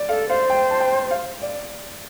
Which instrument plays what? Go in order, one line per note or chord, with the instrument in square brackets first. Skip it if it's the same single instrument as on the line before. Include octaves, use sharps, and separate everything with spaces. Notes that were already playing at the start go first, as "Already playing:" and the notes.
Already playing: [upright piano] D5
[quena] A4 [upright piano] F5
[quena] C5 [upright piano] F5
[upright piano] G5
A5
G5
F5
D5